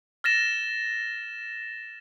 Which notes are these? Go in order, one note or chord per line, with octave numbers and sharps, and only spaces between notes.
F6 A6 A#6 E7